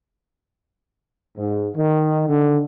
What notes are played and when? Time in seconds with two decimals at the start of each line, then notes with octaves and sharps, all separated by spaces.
1.37 G#2
1.76 D#3
2.28 D3